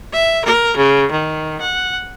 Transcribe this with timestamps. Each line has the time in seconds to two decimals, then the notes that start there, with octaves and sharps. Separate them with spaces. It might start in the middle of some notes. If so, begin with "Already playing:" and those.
0.12 E5
0.44 A#4
0.76 C#3
1.11 D#3
1.60 F#5